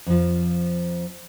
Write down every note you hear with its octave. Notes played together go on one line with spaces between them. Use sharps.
F2 F3